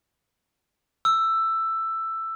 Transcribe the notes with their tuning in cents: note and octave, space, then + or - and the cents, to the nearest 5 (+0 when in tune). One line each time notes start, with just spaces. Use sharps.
E6 +10